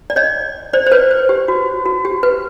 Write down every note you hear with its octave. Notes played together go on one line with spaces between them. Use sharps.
D5
C#5 D#5
C5 D5
C5
B4 C#5
C5
G4
F#4
F#4
G4
B4